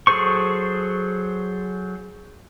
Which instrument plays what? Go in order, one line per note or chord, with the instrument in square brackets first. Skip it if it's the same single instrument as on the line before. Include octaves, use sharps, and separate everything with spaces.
[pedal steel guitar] F#3 G#4 A4 C5 C#6